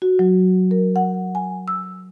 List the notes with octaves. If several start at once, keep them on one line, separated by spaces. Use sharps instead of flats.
F#4
F#3
A#4
F#5
G#5
E6